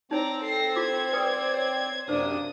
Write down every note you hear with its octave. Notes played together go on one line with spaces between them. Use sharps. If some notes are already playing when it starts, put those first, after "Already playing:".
C4 D#4 C#5 D5 A#5
A4 A#6 C7
F4 C5 D6 G#6
B4 D5 G5 D#6
C#5
F#2 C3 A#3 D4 C5 D#6